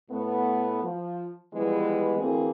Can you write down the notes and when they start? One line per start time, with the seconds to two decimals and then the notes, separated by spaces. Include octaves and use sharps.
0.11 A2 A3 B3
0.83 F3
1.54 E3 F3 G3 G#3 B3
2.18 D2 E3 A#3 C4 G#4